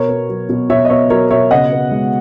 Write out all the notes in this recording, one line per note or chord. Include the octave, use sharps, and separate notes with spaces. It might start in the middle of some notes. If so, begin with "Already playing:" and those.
Already playing: B2 A#4 C#5
B3
F#3
B2
B2 C#5 E5
D#5
B3 C#5 E5
F#3 A#4 C#5
B2 C#5 E5
C#3 D#5 F#5
B3
G#3